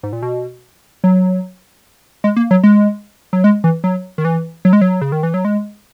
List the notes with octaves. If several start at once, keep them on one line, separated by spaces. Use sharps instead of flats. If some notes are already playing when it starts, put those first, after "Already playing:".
G#2
A#2
B2
F#3
G#3
A#3
F#3
G#3
F#3
G#3
E3
F#3
D#3
E3
F#3
G#3
F#3
C#3
D#3
E3
F#3
G#3